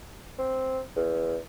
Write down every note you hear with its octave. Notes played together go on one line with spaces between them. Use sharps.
C4
E2